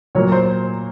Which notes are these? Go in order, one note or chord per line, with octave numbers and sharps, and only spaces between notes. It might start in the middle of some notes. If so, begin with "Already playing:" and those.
A#2 F#3 A#3 C#5
C5